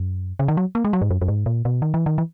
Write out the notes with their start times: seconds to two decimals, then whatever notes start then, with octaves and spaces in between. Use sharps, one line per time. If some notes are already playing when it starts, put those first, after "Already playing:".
Already playing: F#2
0.39 C#3
0.48 D#3
0.57 F#3
0.75 A#3
0.85 G#3
0.93 F#3
1.02 G#2
1.10 F#2
1.21 F#2
1.28 G#2
1.46 A#2
1.65 B2
1.82 D#3
1.94 E3
2.06 D#3
2.18 E3